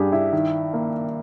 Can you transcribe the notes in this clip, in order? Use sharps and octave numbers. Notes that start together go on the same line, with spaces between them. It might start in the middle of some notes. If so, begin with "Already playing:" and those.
Already playing: G2 G4 G#4
E4
D#3
A#3